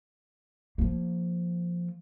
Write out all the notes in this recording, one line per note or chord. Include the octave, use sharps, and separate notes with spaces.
F3 A#3